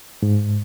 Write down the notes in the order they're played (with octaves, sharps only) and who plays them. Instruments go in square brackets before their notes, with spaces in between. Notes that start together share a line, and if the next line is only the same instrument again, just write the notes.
[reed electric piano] G#2